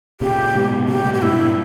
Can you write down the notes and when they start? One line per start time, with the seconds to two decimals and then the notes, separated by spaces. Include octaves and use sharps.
0.21 A#2 C#3 G4
0.55 G#2 B2
0.77 B2
0.88 A#2 C#3 G4
0.99 C#3
1.05 G#2 B2
1.14 G4
1.22 G2 A#2 E4
1.31 B2
1.39 G2 A#2